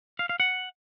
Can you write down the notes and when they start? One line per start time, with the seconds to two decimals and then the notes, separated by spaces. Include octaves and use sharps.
0.19 F5
0.29 F5
0.40 F#5